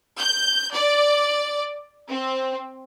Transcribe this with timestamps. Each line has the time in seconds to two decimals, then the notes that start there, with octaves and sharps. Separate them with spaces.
0.18 G6
0.74 D5
2.09 C4